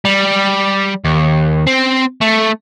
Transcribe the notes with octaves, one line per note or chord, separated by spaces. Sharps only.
G3
D#2
C4
A3